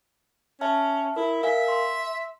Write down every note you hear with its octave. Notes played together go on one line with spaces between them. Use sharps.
C#4 E5 A5 F6
E4 A#4
A#4 E5 F5 G#5
C6